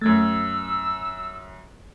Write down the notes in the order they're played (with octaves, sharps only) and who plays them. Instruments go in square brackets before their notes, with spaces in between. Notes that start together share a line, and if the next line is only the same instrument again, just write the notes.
[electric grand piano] F#2 G#6 A6 [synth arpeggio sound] A3 [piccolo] E6